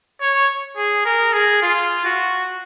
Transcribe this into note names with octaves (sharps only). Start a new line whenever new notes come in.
C#5
G#4
A#4
G#4
F4
F#4